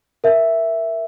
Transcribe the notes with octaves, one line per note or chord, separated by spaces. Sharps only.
A#4 E5